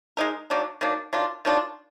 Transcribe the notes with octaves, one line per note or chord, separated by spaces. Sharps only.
G#3 D#4 A#4
D#3 F#3 A#3 D4
D#3 F#3 A#3 D4
D#3 F#3 D4 F4
D#3 F#3 D4 F4